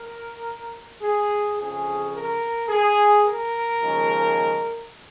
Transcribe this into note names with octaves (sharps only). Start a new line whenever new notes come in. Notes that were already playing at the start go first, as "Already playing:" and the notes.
Already playing: A#4
G#4
F2 C#3 F3 G#4
A#4
G#4
A#4
D#2 C#3 F3 G#3